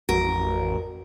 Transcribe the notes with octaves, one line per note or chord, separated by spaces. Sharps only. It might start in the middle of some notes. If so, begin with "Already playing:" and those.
A1 F2 F#4 A#4